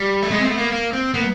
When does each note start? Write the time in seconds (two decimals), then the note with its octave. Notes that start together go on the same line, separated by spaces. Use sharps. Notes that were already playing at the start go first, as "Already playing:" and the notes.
Already playing: G3
0.23 A3
0.31 G#3 B3
0.39 C4
0.45 A3 B3
0.58 A#3
0.72 A#3
0.93 C4
1.14 A#3 B3